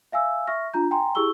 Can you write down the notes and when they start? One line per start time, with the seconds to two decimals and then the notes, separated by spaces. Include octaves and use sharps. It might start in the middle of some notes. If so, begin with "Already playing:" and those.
0.12 E5 F5 G#5 E6
0.47 E5 C#6 F6 A#6
0.74 D4 F4 A#5 G6
0.91 G5 G#5 A#5 C6
1.15 E4 G4 G#4 C#6 E6 G7